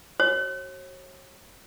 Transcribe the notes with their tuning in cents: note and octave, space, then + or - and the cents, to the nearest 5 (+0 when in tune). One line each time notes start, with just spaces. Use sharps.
F#4 +25 C#5 -40